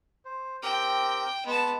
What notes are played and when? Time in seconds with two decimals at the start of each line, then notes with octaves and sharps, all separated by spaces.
0.25 C5
0.63 C4 G4 A#4 G5
1.46 G#3 B3 A5